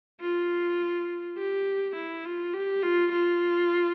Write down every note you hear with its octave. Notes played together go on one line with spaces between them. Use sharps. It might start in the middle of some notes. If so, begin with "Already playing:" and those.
F4
G4
E4
F4
G4
F4
F4